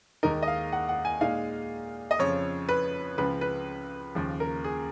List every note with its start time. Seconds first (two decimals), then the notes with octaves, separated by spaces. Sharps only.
0.23 D#2 D#3 G#3 D#4 A#4
0.43 D#5
0.48 F5
0.73 F#5
0.89 F#5
1.05 G#5
1.21 A#2 G#3 D#4 F5
2.11 D#5
2.19 F2 C#3 F3 C#5
2.69 B4
3.18 C#2 C#3 F3 B4
3.41 B4
4.15 D#2 C#3 F3
4.40 A#4
4.64 G#4